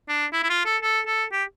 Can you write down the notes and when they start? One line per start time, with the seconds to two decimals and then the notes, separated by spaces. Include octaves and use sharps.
0.08 D4
0.33 E4
0.43 E4
0.50 F4
0.65 A4
0.82 A4
1.07 A4
1.32 G4